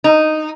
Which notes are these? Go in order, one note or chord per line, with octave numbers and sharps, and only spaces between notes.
D#4